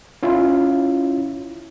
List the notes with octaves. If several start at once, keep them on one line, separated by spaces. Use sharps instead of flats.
C#4 E4 F4